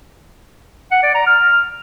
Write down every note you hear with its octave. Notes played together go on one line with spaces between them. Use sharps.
F#5
D5
A#5
F6